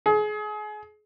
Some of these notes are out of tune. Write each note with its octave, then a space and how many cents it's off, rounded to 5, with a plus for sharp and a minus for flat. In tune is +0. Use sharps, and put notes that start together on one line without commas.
G#4 +30